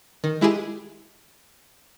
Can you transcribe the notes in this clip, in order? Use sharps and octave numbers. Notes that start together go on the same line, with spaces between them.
D#3
G#3 E4 G4 G#4